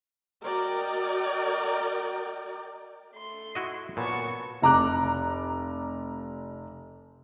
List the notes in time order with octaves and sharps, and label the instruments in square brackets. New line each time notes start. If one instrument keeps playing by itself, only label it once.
[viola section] F#4 A#4 D5 D#5 G5
[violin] A3 C6
[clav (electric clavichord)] E4 F#4 D#5
[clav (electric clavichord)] A#2 [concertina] B3 C#5 A5 [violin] F#4 C#6
[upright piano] F1 A#5 D6 F#6